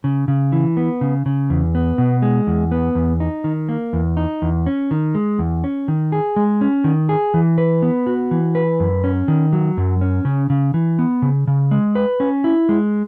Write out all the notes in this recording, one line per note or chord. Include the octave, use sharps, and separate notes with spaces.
C#3
C#3
E3
B3
C#3
C#3
E2
B3
B2
G#3
E2
B3
E2
D#4
D#3
A#3
E2
D#4
E2
C#4
D#3
G#3
E2
C#4
D#3
G#4
G#3
C#4
D#3
G#4
E3
B4
B3
F#4
E3
B4
F#2
C#4
D#3
F#3
F#2
C#4
C#3
C#3
E3
B3
C#3
C#3
G#3
B4
C#4
E4
G#3